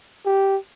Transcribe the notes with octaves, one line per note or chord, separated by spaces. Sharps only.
G4